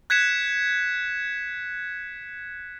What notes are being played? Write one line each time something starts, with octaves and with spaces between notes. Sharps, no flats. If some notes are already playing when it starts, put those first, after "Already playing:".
F#6 G#6 B6 C#7 E7